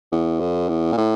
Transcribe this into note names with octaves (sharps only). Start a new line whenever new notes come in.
E2
F2
E2
A#2
A2